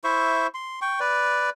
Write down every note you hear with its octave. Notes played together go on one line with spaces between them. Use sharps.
E4 C5 E5 C#6
C6
G5 C#6
B4 D5